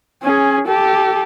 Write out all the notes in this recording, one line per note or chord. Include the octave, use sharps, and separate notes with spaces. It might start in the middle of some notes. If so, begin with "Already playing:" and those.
C#4 G#4
G4 A4